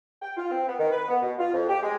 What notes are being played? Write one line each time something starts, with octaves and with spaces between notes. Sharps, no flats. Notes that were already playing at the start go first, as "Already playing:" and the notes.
G5
F4
C4
B3
D#3
B4
B3
B2
F4
F2
G4
G#3